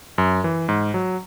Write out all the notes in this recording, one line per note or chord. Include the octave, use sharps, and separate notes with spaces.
F#2
E3
G#2
F#3